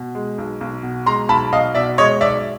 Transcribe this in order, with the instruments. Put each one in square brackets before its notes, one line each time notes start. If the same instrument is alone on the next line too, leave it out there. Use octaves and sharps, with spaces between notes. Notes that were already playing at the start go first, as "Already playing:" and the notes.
Already playing: [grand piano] B2
G#3
B1
B1
B2
G#3 A#5 C6
B1 A5 B5
B1 D#5 F5
B2 D5 E5
G#3 C#5 D#5
B1 D5 E5